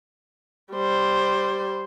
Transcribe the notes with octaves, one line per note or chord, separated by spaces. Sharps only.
G3 C5